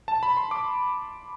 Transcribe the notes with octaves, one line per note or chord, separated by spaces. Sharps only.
A5
B5
C6
D6